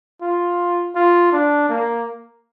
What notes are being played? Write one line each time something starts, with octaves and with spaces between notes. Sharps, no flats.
F4
F4
D4
A#3